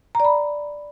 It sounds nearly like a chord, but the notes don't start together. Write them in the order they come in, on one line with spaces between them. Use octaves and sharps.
A#5 D5 B5